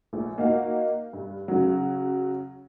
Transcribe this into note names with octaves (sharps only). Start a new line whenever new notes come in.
A#1
A#3 D#4 F#4 F5
G2
C#3 F#3